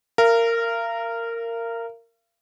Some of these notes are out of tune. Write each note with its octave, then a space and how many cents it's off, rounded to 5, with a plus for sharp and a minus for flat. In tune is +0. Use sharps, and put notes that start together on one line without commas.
A#4 -15 F5 -40